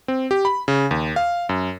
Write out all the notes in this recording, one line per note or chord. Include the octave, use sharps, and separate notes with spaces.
C4
G4
B5
C#3
D#2
F5
F#2